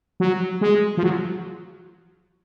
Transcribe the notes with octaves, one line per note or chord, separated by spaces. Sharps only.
F#3
G#3
F3
F#3